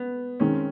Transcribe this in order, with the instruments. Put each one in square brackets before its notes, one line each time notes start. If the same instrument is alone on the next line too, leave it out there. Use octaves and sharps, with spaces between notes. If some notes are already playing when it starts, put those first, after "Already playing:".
Already playing: [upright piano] B3
[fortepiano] D#3 G#3 C4 [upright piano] C#4